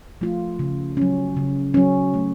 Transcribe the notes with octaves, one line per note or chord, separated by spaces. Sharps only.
F3 A3 F4
C#3
F#3 C#4
C#3
F#3 C#4
A3